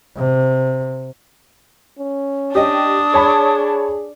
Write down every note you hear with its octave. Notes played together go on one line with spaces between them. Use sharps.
C3
C#4
D4 G4 D#5 D#6
G#4 C#5 A5 B5